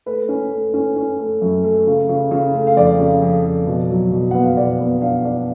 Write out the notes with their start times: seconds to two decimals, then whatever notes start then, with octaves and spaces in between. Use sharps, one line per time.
0.06 A3 B4
0.29 C#4
0.51 A3
0.74 C#4
0.96 C#4
1.19 A3
1.41 F#2
1.64 A3
1.87 C#3
2.09 C#3
2.31 C#3
2.54 A3
2.67 F5
2.77 F2 D5
2.99 C#3
3.22 F2
3.45 F2
3.67 B2
3.90 F#3
4.12 B2
4.31 B3 F#5
4.44 F5
4.57 B2 D5
4.79 B3
5.02 D4 F5
5.24 D4